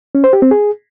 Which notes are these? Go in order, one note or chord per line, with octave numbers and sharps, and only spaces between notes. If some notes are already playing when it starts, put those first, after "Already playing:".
C#4
C5
G4
C4
G#4